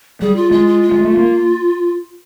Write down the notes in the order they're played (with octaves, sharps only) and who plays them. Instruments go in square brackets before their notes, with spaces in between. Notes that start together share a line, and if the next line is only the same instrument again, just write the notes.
[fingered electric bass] G3 [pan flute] G#4
[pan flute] F4
[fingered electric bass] G#3 [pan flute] F4
[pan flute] F4
F4
[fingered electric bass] G#3
A3
A#3